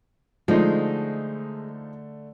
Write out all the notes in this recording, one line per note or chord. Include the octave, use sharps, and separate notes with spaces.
D3 F3 G#3 A3 D#4